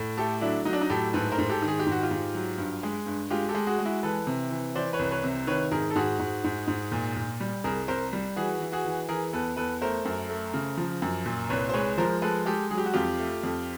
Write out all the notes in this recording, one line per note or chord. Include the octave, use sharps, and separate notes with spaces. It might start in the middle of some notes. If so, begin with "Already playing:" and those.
Already playing: A2
A3 G4 A4
F#3 D4 E4
F#3 D#4
D4
D#4
A2 G4 A4
G#2 A4 B4
A#4 C5
G#2
G4 A4
D#3
G#4
G4
G#2
F#4
F4 G4
G#2
F#3
G2
G#3
G2
G#3 F4 G4
G4 A4
G#3
F#4 G#4
G#3
E4 F#4
E3 A4 B4
C3
E3
E3 C5 D5
B4 C#5
C2
B4 C#5
C3
D#3 B4 C#5
G#2 G#4 A#4
A4
G#2 F#4 G#4
G#2
G#2
G#2
A#2
A#2
G3
C2 G#4 A#4
C2 A#4 C5
G3
E3 F#4 G#4
E3
F#4 G#4
E3
E3 G#4 A#4
E2 A4 B4
E2 A4 B4
A3 A#4 C5
F#2
A3
C#3
F3
F#2
A#2
C2 B4 C#5
C5
G#3 B4 C#5
F3 A#4 C5
G#3 A4 B4
G#3 G4 A4
F#3 G#4
G4
F#4
F2 F4 G4
A3
F2